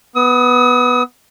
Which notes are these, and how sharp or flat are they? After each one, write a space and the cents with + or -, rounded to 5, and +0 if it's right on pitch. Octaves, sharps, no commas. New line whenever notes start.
B3 +0 D#6 +40